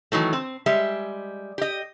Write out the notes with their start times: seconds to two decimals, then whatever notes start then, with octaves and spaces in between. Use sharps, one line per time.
0.12 D#3 E3 F#3 A3
0.33 C4
0.66 G3 G#3 E5
1.58 G4 D#5